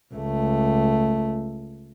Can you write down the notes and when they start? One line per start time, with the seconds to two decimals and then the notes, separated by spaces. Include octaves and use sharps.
0.14 C#2 A3